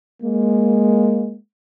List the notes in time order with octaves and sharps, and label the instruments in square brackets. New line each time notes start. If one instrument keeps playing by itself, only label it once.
[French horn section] G#3 A#3